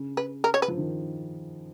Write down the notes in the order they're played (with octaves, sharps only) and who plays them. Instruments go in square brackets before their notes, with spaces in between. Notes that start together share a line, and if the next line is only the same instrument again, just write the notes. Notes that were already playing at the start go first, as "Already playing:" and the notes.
Already playing: [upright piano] C#3
[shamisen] B4
A#4
C#5
B4
[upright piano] F3
D#3